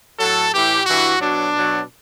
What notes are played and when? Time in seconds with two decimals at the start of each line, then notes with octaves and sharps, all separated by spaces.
0.19 A2 F#3 A4
0.52 A2 E3 G4
0.86 G2 E3 F#4
1.20 B2 F#3 D4
1.54 B2 F#3